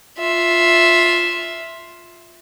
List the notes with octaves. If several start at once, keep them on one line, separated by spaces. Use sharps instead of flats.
F4 E5